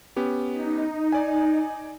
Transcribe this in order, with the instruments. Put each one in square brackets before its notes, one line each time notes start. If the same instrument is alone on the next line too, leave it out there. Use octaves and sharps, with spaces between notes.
[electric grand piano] B3 C#4 G4
[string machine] D#4
[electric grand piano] D5 G#5